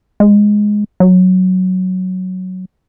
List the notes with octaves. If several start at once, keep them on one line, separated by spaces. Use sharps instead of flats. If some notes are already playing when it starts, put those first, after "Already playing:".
G#3
F#3